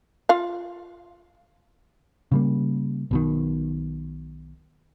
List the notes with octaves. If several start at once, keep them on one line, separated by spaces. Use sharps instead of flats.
F4 F5
C#3 G3 A#3
B1 B2 D#3